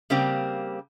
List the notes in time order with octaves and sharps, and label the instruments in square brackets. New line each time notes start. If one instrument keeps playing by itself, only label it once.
[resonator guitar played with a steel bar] C#3 G3 A#3 C4 G4